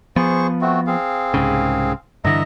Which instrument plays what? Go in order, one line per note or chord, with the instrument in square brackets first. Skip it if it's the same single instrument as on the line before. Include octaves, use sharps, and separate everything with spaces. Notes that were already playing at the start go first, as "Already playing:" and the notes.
[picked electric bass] F3 B3 [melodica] G#4 C5 C#6
[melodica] A3 C4 F#4
C4 G#4 F5
[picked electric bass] C2 G#2 C#3
[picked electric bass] G2 D3 E3 [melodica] D#5 E5 A#5